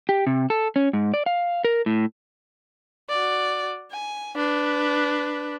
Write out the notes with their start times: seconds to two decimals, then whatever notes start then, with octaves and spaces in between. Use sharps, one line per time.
0.09 G4
0.27 C3
0.50 A4
0.76 C#4
0.93 G#2
1.14 D5
1.26 F5
1.65 A#4
1.86 A2
3.09 F#4 D5
3.92 G#5
4.36 D4 B4